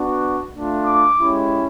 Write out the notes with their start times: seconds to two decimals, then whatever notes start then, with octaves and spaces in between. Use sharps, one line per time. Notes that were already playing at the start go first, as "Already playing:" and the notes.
Already playing: B3 D4 F#4
0.54 A3 D4 F4
0.86 D6
1.18 G#3 C#4 E4 G4